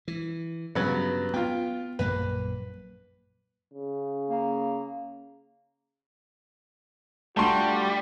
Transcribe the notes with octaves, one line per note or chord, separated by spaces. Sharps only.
E3
G2 C#3 F#3 B3
B3 F4 G5
A#1 F#2 A#3 B4
C#3
A#3
G3 A3 D4 F4 F#4 A5 C6